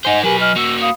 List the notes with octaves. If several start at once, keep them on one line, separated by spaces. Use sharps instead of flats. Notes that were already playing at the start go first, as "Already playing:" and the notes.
D#4 C5 D#5 F#5 G#5
F#3 G4 A#4 B4 G#5
D#5 G#5 F6
A#3 F#4 E6
F5 B5 D#6